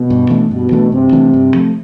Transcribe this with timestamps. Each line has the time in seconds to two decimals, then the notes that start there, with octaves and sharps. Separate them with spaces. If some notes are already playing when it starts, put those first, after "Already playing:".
Already playing: B2
0.10 G2
0.30 E3 A3 D4
0.51 G2 B2
0.71 E3 A3 D4
0.92 G2 C3
1.12 E3 A3 D4
1.34 G2
1.54 F3 A3